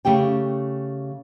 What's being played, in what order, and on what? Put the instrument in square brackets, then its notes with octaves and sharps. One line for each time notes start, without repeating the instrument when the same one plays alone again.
[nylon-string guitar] C#3 A3 G4 G5